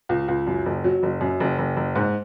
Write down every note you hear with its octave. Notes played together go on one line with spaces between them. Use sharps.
C#2
C#2
F#2
F#1
F#3
F#1
F#2
F#1
F#1
F#1
G#2